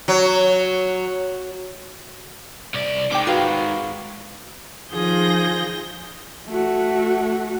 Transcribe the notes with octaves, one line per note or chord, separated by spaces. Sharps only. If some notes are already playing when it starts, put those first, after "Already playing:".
F#3
C2 D5
D#3 G#3 G5 D6
F#4 B4 F5
D#3 F3 F4 G#4 G6 A#6
A3 F#4